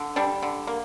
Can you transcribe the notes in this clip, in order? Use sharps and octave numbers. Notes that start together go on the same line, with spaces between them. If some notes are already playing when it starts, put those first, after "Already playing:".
Already playing: D3
G3 D4
D3
A#3